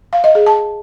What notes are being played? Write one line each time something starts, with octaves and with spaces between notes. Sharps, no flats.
F5
D#5
G#4
A5